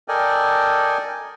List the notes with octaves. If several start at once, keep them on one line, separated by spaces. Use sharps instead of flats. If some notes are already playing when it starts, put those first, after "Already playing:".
A4 A#4 D5 D#5 G5 G#5